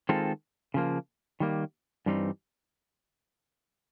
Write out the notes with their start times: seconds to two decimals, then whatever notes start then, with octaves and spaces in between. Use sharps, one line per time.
0.09 D#3 G#3 C4 F4 A4
0.74 C#3 F3 A#3
1.40 D#3 G3 A#3
2.06 G2 E3 G3 C4 D#4